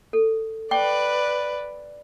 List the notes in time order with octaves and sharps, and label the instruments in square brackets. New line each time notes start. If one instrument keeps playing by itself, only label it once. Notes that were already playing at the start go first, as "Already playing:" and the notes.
[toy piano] A4
[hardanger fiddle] B4 D5 [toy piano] G5 C#6 D6